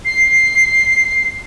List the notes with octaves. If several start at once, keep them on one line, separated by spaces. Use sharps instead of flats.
C7